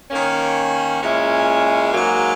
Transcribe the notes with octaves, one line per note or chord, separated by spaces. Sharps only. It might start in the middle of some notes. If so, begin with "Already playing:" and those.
D#3 A#3 C#4
A#2 G#3 C#4 E4
G#2 F#3 A#3